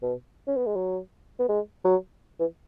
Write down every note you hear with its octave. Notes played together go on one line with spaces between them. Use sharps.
B2
C#4
B3
G#3
F#3
B3
G#3
F#3
E3